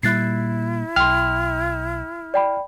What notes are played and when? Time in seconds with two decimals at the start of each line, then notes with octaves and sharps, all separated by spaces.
0.03 A#2 G3 E4 F#6 A6 C7
0.96 B1 G5 C6 F6
2.34 D5 G5 B5